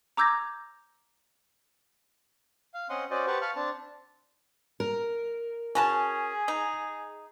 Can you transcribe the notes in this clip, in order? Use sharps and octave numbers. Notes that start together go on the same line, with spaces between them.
A#5 D6 E6 G6 G#6 A#6
F5
C4 C#4 D#5 F#5 C6
C#4 F#4 C5 D5 D#5
G4 B4 C5 F#5 A5 C#6
F5 A5 B5 C#6 F6
C4 D4 A5
A#4
C#4 F#4 G#4 G#5 A5
D#4